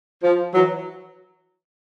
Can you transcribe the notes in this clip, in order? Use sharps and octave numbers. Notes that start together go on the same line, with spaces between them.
F3
E3 F#3